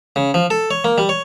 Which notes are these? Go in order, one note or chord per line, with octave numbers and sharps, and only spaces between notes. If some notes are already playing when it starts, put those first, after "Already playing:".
C#3
F3
A4
C#5
A#3
G3
C#5